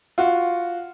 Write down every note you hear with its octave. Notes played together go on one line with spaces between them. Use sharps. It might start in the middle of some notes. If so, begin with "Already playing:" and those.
F4 F#4